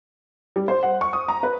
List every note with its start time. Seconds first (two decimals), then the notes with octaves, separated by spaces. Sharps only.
0.56 G3
0.68 C5
0.83 F#5
1.01 C#6
1.13 D#6
1.28 A#5
1.43 B4